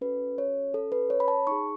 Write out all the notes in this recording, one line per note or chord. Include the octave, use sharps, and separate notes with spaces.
C#4 F#4 A4 B4
C#5
A4
B4
C#5
B5
A5
D#4 G#4 C#6